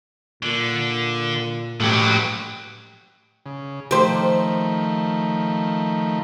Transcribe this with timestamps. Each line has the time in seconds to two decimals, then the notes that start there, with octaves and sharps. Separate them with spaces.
0.43 A#2 D3
1.80 A2 F#3 G4
3.46 C#3
3.91 D#3 F3 A3 G4 C5